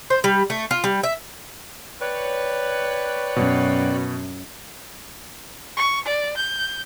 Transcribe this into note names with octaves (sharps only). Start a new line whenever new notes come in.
C5
G3
A3
F4
G3
E5
B4 C#5 D5 G5 F#6
F#2 B2
C#6
D5
G6